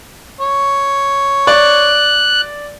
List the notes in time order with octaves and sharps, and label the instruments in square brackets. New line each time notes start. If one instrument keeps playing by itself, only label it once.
[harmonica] C#5
[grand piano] D5 [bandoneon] F#6